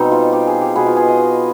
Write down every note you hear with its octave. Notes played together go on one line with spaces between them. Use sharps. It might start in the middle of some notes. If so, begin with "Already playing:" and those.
Already playing: B2 G3 C4 D#4
F4
G4
G#4
G4
B2 B3 G#4
F4
G#4
D#5